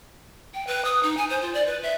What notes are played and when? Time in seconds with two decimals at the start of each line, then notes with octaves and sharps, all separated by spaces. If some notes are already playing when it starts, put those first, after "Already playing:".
0.54 G5
0.67 B4
0.85 D#6
1.03 D#4
1.17 G#5
1.30 C5
1.42 F4
1.54 D5
1.67 B4
1.83 E5